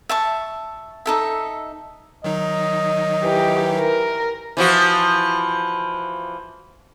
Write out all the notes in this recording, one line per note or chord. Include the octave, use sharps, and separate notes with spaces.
E5 A5 C#6
D#4 A4 E5
D#3 F#3 D#4 D#5
E3 G4
A#4
E3 F3 F#4